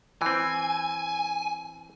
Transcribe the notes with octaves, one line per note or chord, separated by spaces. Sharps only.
E3 C4 G#5